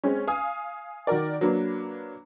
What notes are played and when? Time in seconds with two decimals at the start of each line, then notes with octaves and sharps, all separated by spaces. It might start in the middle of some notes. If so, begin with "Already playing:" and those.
0.04 G#3 C4 C#4
0.27 F5 G#5 D#6
1.07 D#3 F#4 A#4 D5
1.41 F#3 A#3 D4 B4